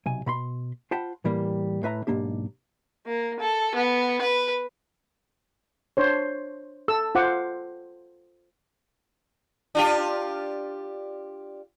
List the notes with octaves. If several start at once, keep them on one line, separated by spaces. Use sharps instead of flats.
B1 C3 G#5
B2 B5 C6
F4 C5 F#5 G5 A5 B5
A2 E3 G3 A#3
A2 B4 E5 A#5
B1 G#2 A#3 D4 G4
A#3
A4
B3
B4
D4 C5 C#5
A4 E6
F4 C5 F#5 D6
D4 F4 G4